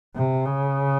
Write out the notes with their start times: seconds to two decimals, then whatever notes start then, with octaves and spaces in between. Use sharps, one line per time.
0.15 C3
0.45 C#3